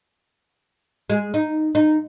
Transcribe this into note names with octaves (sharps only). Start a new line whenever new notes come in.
G#3
D#4
D#4